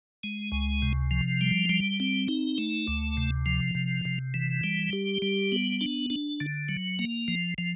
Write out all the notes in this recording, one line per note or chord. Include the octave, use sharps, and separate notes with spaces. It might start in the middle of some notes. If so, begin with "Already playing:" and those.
G#3
C#2
C3
F3
G3
G3
C4
D#4
A3
D2
C3
F3
C3
C3
E3
G3
G4
G3
B3
D4
D4
D3
F#3
A#3
F3
F3